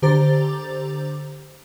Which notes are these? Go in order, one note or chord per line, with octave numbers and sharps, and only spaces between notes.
D3 G4 C5 A#5 D6 A6